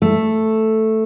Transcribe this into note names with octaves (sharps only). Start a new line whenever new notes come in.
A3